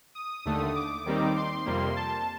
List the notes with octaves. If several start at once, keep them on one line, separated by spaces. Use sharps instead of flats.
D#6
D#2 D3 A3
D6
D#2 D#3 G3 C4 D#4
C6
F2 C3 G3 A#3
A5